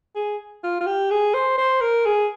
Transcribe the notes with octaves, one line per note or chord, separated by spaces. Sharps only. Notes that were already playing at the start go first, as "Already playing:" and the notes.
G#4
F4
F4
G4
G#4
C5
C5
A#4
G#4